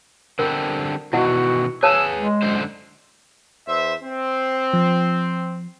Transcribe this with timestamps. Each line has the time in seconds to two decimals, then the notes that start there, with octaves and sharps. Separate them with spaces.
0.39 D3 G3 C4 A#4
1.13 B2 D#3 E3 E4 F#4 D#5 F#5
1.83 G#4 B4 C#5 F5 G#5 A5 E6
2.17 G#3
2.42 F#2 D3 C5
3.68 E2 C5 E5
4.04 C4
4.74 F3